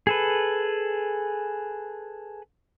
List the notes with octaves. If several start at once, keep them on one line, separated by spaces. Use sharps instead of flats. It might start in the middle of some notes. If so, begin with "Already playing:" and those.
G#4 A4 B4